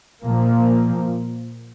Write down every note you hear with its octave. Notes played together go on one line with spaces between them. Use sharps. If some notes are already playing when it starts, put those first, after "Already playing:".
A#2 F3 A#3